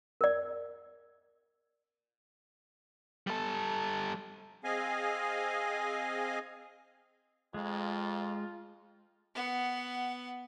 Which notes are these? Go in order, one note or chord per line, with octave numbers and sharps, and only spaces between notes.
A#4 D5
G3 A4
C4 G#4 D#5 F5 G#5
F2 G#3 F4
B3 F#5